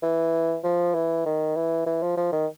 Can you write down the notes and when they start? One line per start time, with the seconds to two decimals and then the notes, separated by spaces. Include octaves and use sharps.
0.03 E3
0.64 F3
0.95 E3
1.26 D#3
1.56 E3
1.87 E3
2.03 F3
2.17 F3
2.33 D#3